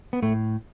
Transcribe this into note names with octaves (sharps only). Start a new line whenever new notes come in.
B3
A2 A3